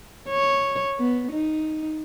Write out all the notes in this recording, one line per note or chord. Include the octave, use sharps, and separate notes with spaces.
C#5
B3
D#4